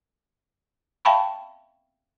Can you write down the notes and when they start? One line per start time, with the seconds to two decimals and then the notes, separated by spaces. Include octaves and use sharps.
1.05 E5 F5 G5 A5 B5 C#6